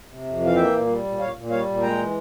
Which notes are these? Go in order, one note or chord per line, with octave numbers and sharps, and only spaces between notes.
C3
F2
E3 F5
A#3 E5 G5
A#2
G3
A#2
A#2 C#5 F5
A#2
G3 C#5 F5
A#2
G#3 G5 A#5
E3